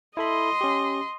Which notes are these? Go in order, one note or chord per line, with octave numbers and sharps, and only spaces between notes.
E4 A4 D#5 B5 C6
C#4 G4